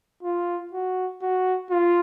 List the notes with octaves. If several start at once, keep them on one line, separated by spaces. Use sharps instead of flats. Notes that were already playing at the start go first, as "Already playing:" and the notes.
F4
F#4
F#4
F4